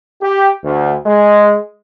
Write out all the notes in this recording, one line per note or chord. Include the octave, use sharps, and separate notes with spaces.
G4
D2
G#3